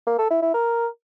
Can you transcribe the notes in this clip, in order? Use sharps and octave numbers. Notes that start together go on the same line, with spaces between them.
A#3
A4
E4
E4
A#4